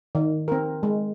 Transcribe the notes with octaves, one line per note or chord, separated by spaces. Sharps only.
D#3
C4 A#4
G#3